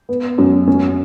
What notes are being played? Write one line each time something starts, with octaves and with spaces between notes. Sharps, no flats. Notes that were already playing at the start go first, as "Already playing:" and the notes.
B3
F#2
C#4